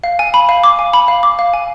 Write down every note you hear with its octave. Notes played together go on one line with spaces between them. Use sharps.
F5
G#5
B5
F5
D6
G#5
B5
F5
D6
F5
G#5